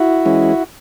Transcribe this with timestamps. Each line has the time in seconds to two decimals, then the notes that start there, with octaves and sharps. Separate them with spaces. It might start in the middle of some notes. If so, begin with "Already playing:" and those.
Already playing: E4 F#4
0.25 E3 G#3 C#4